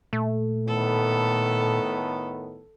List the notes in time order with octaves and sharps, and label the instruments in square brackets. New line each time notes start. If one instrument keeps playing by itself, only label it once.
[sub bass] A#2 [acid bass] A3
[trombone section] A2 D#3 B3 [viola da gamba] A4